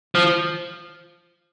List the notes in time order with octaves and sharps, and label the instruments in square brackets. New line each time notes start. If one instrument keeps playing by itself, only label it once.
[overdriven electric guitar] F3